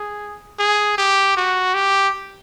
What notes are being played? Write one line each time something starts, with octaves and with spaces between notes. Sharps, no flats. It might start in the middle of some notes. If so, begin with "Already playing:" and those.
Already playing: G#4
G#4
G4
F#4
G4